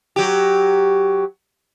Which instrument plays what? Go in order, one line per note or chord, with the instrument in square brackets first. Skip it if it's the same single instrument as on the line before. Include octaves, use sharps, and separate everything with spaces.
[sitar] F#3 G4